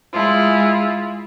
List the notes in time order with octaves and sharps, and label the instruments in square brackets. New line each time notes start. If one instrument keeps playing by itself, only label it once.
[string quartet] G#3 E4 F4